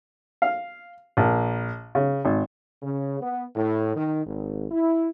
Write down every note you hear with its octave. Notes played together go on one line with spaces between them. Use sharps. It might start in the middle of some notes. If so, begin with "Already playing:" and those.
F5
A#1
C#3
G#1
C#3
B3
A2
D#3
G#1
E4